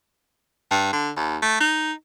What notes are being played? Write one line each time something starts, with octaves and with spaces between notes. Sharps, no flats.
G2
D3
D#2
A3
D#4